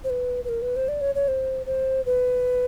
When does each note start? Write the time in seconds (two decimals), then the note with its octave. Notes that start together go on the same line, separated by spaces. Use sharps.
0.04 C5
0.10 B4
0.45 B4
0.49 A#4
0.62 B4
0.76 C5
0.88 D5
1.01 C#5
1.15 C#5
1.28 C5
1.66 C5
2.06 B4